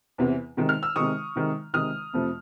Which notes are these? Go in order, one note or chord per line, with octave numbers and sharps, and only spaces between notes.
E2 C3 E3
C3 D#3 G#3
F6
E6
C3 D#3 G#3 C#6 D#6
C3 D#3 G#3
C3 D#3 G#3 D#6 F6
F2 C3 F3 A3